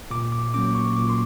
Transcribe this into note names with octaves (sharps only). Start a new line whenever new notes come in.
A#2 D6
D6
F#3 A#3 C#4 D6
C#6
A#2 D6
C6